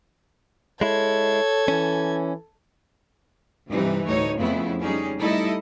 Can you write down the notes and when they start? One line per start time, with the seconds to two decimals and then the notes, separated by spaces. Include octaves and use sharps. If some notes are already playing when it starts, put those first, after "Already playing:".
0.81 G#3 E4 A4 C#5 G#6
1.68 E3 C#4
3.70 G2 C3 E3 G3 D#4
4.06 D2 A2 D#4 C#5
4.38 F2 C#3 A3 B3 E4
4.82 G3 C#4 D#4 G#4
5.19 G3 A3 D#4 E4 A4 D#5